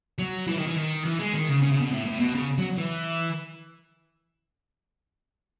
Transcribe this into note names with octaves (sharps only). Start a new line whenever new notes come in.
F#3
E3
D#3
E3
D#3
E3
G#3
D#3
C#3
C#3
C#3
B2
A2
A2
B2
C#3
F#3
E3